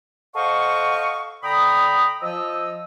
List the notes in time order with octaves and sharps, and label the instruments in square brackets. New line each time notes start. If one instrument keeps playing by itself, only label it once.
[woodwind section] A4 C5 D#5 F5 F#5 C#6
D3 G5 A#5 B5 D#6
F3 D#5 E6